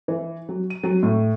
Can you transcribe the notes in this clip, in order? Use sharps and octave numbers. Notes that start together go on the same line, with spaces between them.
E3
F#3
D#7
F#3
A2